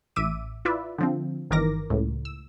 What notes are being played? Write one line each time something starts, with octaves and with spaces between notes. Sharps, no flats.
A1 E5 D6 D#7
E4 F4 B4 D5 E5
D3 F3 C4
G1 D#3 E3 A#4 D6 A#6
C#2 A2
E6